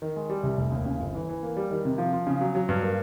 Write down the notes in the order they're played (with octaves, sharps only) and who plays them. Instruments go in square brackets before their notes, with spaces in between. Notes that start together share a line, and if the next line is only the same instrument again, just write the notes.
[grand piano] D#3
G#3
G3
C2
F1
D#2
C#3
G1
E3
E3
A#3
G3
D#3
C3
F3
F3
C#3
F#3
F#3
G2
A#3